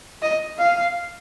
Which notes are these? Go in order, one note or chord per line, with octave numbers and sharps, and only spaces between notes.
D#5
F5